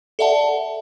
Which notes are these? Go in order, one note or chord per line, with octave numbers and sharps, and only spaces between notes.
A4 D5 E5 F#5 A5